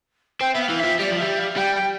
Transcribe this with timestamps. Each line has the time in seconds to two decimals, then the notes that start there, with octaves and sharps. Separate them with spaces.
0.40 C4 G5
0.53 B3 E5
0.61 F5
0.69 E3
0.79 E5
0.84 F3
0.99 G3 D5
1.10 F3
1.17 G3 E5
1.37 F5
1.56 G3 G5
1.74 G5